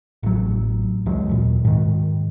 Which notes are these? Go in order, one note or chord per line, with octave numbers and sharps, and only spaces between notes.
A1 F#3
C#2 E3 F#3 G#3
D#2 A#2
G#2 D#3